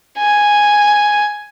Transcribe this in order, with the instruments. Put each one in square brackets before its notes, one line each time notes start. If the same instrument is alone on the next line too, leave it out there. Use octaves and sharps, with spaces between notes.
[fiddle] G#5